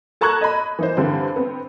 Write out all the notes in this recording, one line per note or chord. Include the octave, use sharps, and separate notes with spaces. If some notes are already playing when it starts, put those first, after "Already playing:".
A4 A5 A#5 C#6 F#6 G#6
D#5 B5
E3 D#4 C5
G2 D3 E3 C4
B3 C4